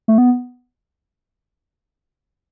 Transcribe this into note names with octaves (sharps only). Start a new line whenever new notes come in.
A3
B3